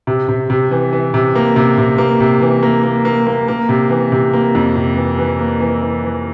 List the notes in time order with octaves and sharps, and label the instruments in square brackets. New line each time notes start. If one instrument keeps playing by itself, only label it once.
[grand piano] C3
C3
C3
E3
E3
C3
A#3
C3
C3
A#3
C3
E3
A#3
A#3
A#3
A#3
A#3
C3
E3
C3
A#3
F2
C3
E3
E3
A#3
E3
E3
E3